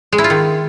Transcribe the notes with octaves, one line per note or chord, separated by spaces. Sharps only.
G#3
E4
F4
D#3